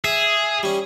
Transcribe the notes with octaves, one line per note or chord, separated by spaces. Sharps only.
G#4 E5
G3 C#4